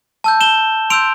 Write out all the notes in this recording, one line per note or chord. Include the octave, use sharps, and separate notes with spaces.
A5 E6 G6
E7 G7
C6 E6 G6 D7 F7